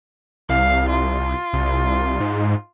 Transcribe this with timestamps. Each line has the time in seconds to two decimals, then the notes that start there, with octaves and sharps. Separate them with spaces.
0.49 C2 F5
0.90 F4
1.53 C2
2.20 G#2